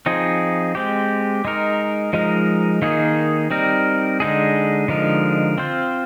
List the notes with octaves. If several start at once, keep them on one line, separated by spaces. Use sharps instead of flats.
F3 C4 D#4 G#4
G#3 C4 G4
G#3 D#4 A#4
F3 G#3 D#4 A#4
D#3 A#3 D#4 G#4
G3 C4 D#4 A#4
D3 G#3 D#4 G#4
D3 F3 G#3 D#4 A#4
C4 F4 C5